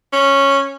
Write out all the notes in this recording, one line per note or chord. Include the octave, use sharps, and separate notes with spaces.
C#4